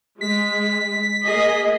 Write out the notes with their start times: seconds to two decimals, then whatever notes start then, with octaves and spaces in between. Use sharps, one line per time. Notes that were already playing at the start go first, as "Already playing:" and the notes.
0.21 G#3 B6
1.25 A#3 G#4 D#5